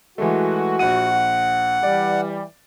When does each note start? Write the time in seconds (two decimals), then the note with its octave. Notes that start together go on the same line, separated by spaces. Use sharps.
0.18 E3 G#3 A3 F#4
0.79 A#1 F#5 D#7
1.83 E3 G3 D5